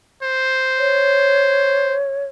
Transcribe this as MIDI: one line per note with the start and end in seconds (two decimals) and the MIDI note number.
0.23 1.96 72
0.79 2.26 73